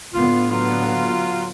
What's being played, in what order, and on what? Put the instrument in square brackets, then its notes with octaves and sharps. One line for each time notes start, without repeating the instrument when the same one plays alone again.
[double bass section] A2 D3 B3 [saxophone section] F4
[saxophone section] F#3 F4